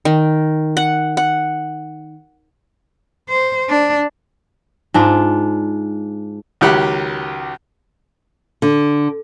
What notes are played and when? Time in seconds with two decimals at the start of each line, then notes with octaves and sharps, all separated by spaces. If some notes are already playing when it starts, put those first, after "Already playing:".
0.05 D#3
0.77 F#5
1.17 F#5
3.29 C5
3.69 D4
4.94 G#2 D4 F4
6.61 C#2 D#3 F#3 G4 F#5 B5
8.62 D3